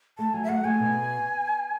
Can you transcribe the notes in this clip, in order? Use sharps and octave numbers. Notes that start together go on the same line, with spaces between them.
A3 A5
F#3 G#5
E5
A3 F#5
A3 G#5
B2